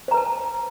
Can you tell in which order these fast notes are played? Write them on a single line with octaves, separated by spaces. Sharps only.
C5 A#5 B4 A5